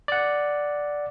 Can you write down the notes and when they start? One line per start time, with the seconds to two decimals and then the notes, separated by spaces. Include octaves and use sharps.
0.08 D5 F#5